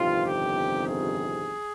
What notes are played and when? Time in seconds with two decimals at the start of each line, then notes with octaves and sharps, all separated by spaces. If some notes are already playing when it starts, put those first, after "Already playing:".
Already playing: G1 F2 C3 D#3 F4
0.24 G4
0.85 G#4